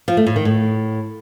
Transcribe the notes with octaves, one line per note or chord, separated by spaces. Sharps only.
F3
A3
A2
D#3
A2